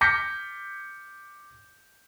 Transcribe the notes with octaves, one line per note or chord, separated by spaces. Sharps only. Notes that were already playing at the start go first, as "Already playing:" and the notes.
D6 F6 G6 A#6 B6 C#7